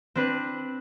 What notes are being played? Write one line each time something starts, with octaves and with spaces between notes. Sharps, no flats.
C4 D4 B4